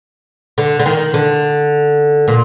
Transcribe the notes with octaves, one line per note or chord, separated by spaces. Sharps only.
D3
D3
D#3
D3
A#2